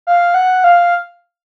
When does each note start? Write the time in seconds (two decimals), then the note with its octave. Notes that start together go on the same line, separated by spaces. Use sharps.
0.07 F5
0.34 F#5
0.64 F5